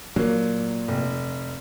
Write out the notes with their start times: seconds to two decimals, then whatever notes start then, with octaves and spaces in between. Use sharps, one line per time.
0.16 A#2 F#3 A#3
0.88 F1